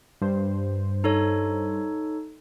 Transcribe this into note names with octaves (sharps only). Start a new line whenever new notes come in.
G2 C5
D#4 A4 C#5